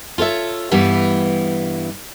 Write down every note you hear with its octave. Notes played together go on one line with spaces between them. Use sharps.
F4 A4 C#5 E5
G2 E3 G3 B3 E4